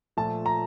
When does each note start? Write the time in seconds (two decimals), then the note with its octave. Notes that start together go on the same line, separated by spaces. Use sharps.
0.17 A#2 F3 A3 A5
0.46 A#5